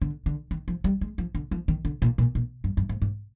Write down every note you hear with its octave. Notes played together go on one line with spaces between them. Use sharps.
D3
D3
D#3
F3
G3
G#3
F3
D3
F3
D#3
D3
A#2
A#2
A#2
G2
G2
G#2
G#2